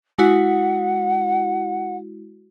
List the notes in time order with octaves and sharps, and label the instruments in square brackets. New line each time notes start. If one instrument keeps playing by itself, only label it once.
[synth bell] G#3 E4 F#4 [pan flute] F#5